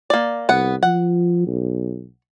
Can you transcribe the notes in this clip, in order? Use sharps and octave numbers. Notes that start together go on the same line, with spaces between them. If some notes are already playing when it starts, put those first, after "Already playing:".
A#3 D5
C2 B3 F#5
F3 F#5
B1